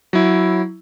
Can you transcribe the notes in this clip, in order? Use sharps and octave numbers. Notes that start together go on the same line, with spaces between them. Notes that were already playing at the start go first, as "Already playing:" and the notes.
F#3 E4